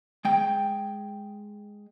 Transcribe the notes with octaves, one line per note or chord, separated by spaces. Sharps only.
G#3 G5